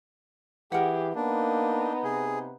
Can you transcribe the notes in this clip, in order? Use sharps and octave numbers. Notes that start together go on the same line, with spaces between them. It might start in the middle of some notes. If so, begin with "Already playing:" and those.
E3 G4 G#4 A#4 F#5
A#3 B3 D4 D#4
C3 G#4